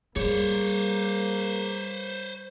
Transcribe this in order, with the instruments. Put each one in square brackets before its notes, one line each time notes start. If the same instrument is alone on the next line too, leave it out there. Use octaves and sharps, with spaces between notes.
[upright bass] G3 [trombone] A#3 [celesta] G#4 [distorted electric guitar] C5 C#5